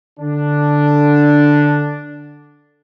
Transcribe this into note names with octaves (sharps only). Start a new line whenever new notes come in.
D3 D4